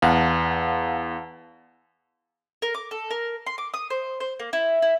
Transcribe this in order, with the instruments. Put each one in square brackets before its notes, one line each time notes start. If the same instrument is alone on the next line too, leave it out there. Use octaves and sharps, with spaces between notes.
[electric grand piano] E2 [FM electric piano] F5 F#5 A5
[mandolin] A#4
D6
A4
A#4
C6
D6
D#6
C5
C5
A#3
E4
E4